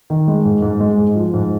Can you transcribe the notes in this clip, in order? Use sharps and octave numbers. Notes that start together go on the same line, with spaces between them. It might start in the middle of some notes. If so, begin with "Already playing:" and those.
D#3
G#3
G#2
G#2
G#3
G#2
F3
G#2